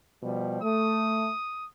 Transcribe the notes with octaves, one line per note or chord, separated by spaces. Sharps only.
B2 F3 G3
A3 D#6